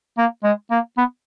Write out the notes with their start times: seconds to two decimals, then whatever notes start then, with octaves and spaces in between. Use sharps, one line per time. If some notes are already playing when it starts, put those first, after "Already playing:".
0.18 A#3
0.44 G#3
0.71 A#3
0.98 B3